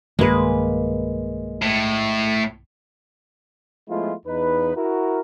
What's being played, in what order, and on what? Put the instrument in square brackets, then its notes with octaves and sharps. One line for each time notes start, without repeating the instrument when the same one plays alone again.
[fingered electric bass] B1 G2 D#3 [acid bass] G#3 [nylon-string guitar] A#3 B4
[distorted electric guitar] A2
[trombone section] F3 G#3 A3 B3 E4 F4
E2 D#4 B4
E4 F#4 A#4